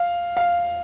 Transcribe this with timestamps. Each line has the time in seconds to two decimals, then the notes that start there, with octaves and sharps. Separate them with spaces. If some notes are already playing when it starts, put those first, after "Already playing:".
Already playing: F5
0.37 F5